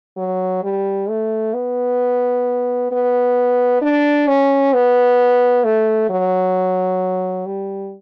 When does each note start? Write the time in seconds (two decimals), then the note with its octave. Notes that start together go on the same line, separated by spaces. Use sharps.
0.17 F#3
0.64 G3
1.09 A3
1.54 B3
2.91 B3
3.82 D4
4.28 C#4
4.74 B3
5.64 A3
6.10 F#3
7.47 G3